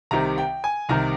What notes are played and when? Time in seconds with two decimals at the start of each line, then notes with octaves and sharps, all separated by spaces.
0.11 C2 C3 D#3 A#5
0.38 G5
0.64 G#5
0.89 C2 C3 D#3 A#5